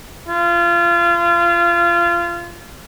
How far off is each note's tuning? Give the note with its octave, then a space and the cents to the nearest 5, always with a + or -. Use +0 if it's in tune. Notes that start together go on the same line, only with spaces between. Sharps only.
F4 -25